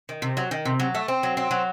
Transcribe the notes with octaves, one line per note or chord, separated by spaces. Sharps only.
D#3
C3
F#3
D#3
C3
F#3
A3
C4
F#3
C4
F#3